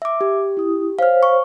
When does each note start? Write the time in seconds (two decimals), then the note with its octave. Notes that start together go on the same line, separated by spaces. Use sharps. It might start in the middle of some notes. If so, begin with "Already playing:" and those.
0.02 E5 D6
0.21 G4
0.57 E4 D#6
0.99 C5 C#5 F5 F6
1.23 C#6